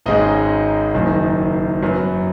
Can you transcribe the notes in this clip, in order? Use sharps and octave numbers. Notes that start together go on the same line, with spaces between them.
G#1 G#2 G#3 C#4 D#4 D#5
F#1 F#2 D#3
F#2 F#3 B3